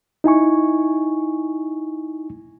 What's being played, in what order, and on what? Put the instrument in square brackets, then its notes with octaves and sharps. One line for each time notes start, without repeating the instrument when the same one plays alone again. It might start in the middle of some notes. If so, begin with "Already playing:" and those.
[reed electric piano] D#4 E4 G#5 C#6